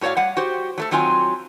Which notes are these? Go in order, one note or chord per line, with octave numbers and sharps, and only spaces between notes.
A2 F#4 C#5 D5 F5
G3 F#5
F#4 G4 C5
F#3 A3 A4
D#3 F#3 C4 F4 F5 G#5